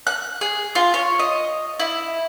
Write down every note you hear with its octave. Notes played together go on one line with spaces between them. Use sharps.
F#6
G#4
F4
C#5
D#5
E4